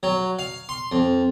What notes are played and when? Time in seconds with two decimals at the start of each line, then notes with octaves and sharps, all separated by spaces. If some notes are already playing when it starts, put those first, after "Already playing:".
0.03 F#3
0.39 F5
0.69 C6
0.92 F2